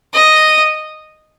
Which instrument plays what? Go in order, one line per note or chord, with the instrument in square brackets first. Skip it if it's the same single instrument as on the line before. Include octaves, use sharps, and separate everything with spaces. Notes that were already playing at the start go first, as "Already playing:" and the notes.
[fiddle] D#5